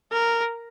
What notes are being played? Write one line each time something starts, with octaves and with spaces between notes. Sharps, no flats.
A#4